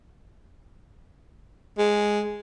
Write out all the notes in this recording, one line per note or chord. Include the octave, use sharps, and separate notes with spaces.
G#3